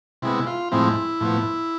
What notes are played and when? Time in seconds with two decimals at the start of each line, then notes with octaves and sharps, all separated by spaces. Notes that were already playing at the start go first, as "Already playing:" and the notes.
0.22 C3 G#3 B3 E4
0.47 F4
0.72 A2 F3 G#3 C4 E4
1.21 A2 F3 B3